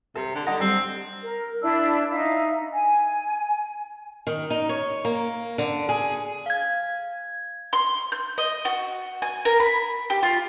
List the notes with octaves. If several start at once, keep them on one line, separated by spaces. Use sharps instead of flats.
C3 A4
D3
D3 D#4 F#5 A#5
G3 C4
A#4
D4 E4 E6
D#4 E5 F5
G#5
D#3
D#4
C#5
A#3
D3
G#4
F5 G#6
C6
G6
D#5
F#4
G#5
A#4
B5
G4
F4